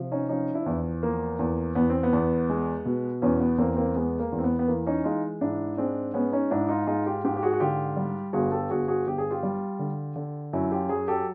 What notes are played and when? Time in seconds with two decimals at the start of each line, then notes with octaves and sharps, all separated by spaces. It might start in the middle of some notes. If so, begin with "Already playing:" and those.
Already playing: C3 F3
0.12 C#4 D#4
0.29 F3 C#4 D#4
0.55 D4 E4
0.66 E2
1.03 F3 A#3
1.39 E2
1.75 E2 B3
1.90 C4
2.03 B3
2.13 E2
2.50 G#3
2.85 B2
3.22 E2 B3 C#4
3.40 B3
3.58 E2 A#3 C4
3.76 A#3 C4
3.95 G#3 B3
4.20 A#3
4.32 E2
4.38 C4
4.44 B3
4.59 B3
4.68 E3 A#3
4.87 C#4 D#4
5.04 G#3 D#4 F4
5.41 G#2 D4 E4
5.77 G#3 C4 D4
6.14 G#3 B3 C#4
6.32 C#4 D#4
6.51 G#2 D4 E4
6.69 D#4 F4
6.87 G#3 D#4 F4
7.06 F4 G4
7.25 G#2 F4 G4
7.37 G4
7.43 F#4 G#4
7.53 F#4
7.60 D3 F4 G4
7.97 G3
8.33 G1 F#4 G#4
8.51 G4 A4
8.70 G1 F#4 G#4
8.88 F#4 G#4
9.07 G1 G4
9.18 G#4
9.30 F4 G4
9.43 G3
9.79 D3
10.16 D3
10.53 F#2 E4 F#4
10.72 F4 G4
10.89 F#3 F#4 G#4
11.08 G4 A4